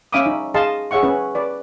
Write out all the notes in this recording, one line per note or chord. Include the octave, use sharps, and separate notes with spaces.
C#4 E5 F5 B5 D6 D#6
D#4
G#4 D#5 F5 A5 C6
G#4 C#5 E5 F#5 C#6
C#4 B4
B4 D5